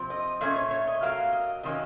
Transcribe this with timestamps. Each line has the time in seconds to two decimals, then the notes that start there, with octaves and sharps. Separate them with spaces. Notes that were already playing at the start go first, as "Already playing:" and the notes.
Already playing: C3 F3 C4
0.10 D#5
0.41 A#2 A3 C#4 D#5
0.56 C#5
0.71 C#5
0.87 D#5
1.02 C3 F#3 A#3 F5
1.33 D#5
1.63 C3 D#3 F#3 A#3 C#4 D#5